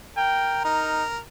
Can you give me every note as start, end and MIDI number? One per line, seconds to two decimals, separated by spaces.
0.17 0.64 70
0.17 0.60 79
0.64 1.04 63
0.64 1.19 70